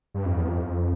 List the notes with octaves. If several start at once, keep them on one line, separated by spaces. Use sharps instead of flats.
G2
F2
E2
F2